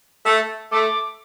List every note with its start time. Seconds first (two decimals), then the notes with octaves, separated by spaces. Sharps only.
0.26 A3
0.72 A3 D6